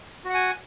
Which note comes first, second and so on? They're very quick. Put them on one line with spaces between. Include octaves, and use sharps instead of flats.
F#4 F#5 G#5